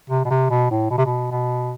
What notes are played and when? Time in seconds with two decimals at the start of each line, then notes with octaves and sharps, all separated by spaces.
0.10 C3
0.25 B2
0.30 C3
0.50 B2
0.71 A2
0.91 B2
0.98 C3
1.06 B2
1.31 B2